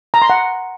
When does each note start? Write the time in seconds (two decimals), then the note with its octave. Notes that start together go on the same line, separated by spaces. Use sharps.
0.14 A#5
0.22 C6
0.30 F#5